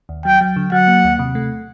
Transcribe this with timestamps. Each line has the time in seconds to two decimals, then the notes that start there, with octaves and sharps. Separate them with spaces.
0.09 D#2
0.25 F#3 G5
0.41 F#3
0.56 D3
0.72 F#3 F#5
0.88 A#3
1.04 D#2
1.19 C3
1.35 A3